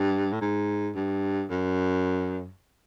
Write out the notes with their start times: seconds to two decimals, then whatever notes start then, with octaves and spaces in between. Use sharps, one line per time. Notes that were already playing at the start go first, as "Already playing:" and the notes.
Already playing: G2
0.33 A2
0.41 G#2
0.95 G2
1.51 F#2